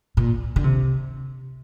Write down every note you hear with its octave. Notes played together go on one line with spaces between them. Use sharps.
A#2
D3
C3